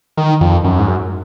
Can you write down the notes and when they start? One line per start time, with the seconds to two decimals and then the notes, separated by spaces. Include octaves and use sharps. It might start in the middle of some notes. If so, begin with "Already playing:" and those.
0.17 D#3
0.41 F2
0.64 F#2
0.79 G#2
0.87 F#2